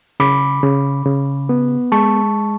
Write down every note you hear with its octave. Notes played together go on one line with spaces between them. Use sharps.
C#3 B5 D6
C#3
C#3
B3
G#3 A5 C#6